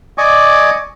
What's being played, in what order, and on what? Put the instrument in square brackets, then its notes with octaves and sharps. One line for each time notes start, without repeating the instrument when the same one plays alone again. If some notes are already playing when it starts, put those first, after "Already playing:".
[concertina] D5 D#5 G#5 C#6 D6